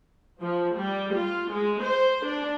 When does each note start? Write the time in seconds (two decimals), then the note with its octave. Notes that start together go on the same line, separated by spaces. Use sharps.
0.41 F3
0.76 G3
1.15 F4
1.52 G#3
1.82 C5
2.25 D4